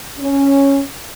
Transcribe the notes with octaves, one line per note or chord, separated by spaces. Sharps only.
C#4